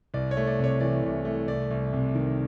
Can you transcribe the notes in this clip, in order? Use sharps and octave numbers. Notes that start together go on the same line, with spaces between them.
C2 D5
C#5
A3
D5
C3 C#5
E3 D5
C2
A3
C2 D5
C2
C3
D#3